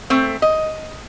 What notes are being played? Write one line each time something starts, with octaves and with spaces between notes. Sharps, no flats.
A3 C4
D#5